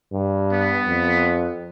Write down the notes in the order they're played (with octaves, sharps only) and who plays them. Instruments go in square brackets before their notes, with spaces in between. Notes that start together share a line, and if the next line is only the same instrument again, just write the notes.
[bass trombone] G2
[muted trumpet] B3
[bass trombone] F2